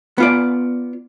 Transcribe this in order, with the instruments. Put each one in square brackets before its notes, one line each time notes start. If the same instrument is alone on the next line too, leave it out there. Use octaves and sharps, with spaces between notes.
[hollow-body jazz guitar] B3 F4 D5